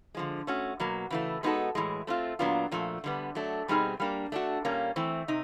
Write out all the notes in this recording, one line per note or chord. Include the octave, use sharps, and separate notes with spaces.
D3 F3 G#3
A3 C#4 F#4
B2 F#3 A#3
C#3 E3 A3
G#3 B3 D#4 F#4 A4
A2 E3 G#3
A3 C4 F4
A#2 F#3 B3 D4 F4
A#2 F3 A3
D3 G3 B3
F#3 A3 D4
B2 G3 C4 D#4 G#4
G3 A#3 D4
A3 D4 F#4
A#2 G3 A#3 C#4
E3 A3 C4
C3 D#4